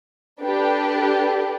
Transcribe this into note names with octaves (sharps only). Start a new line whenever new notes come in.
D4 G4 A4 B4